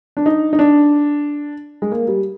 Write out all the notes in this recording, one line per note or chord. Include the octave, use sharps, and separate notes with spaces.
D4
D#4
D#4
D4
G#3
A#3
G3